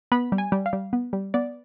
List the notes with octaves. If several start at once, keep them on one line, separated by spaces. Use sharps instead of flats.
B3 B5
G3
G#5
G3
F5
G3
B3
G3
B3 D5